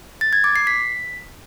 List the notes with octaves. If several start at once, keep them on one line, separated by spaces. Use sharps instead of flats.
A6
G#6
D6
C7
B6